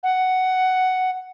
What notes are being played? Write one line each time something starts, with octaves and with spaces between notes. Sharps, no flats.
F#5